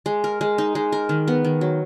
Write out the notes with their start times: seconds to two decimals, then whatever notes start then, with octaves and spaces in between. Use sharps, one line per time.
0.06 G#3
0.24 A#4
0.41 G#3
0.58 D#4
0.75 G#3
0.92 A#4
1.09 D#3
1.28 B3
1.45 D#3
1.61 F#3